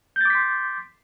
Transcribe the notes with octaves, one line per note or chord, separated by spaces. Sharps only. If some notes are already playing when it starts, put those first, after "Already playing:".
C6 D6 G6 A6 B6